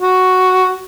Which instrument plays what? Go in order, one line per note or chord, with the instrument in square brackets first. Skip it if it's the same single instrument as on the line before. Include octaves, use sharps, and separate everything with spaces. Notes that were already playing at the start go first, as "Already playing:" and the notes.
[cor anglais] F#4